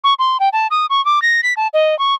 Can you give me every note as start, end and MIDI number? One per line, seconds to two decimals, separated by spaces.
0.04 0.14 85
0.19 0.37 84
0.40 0.49 79
0.53 0.67 81
0.71 0.86 87
0.90 1.03 85
1.05 1.22 86
1.22 1.41 94
1.43 1.54 95
1.57 1.67 81
1.73 1.97 75
1.99 2.15 85